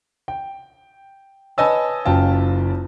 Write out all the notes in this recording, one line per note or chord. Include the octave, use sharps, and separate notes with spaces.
G5
B4 C#5 D#5 G#5 A5 E6
F#1 F#2 F4 G5 A5